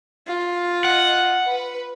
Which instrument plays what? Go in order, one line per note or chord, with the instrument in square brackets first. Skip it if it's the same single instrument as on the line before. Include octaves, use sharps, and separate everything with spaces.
[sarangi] F4
[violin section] D#5 [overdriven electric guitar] F#5
[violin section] B4